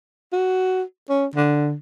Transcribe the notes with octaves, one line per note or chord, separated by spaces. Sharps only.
F#4
C#4
D3